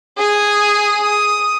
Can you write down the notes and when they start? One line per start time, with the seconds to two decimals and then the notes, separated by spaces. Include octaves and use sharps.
0.18 G#4 D#6
1.02 D#6